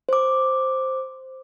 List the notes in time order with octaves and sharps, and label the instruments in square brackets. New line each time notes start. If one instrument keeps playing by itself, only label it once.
[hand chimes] C5 D6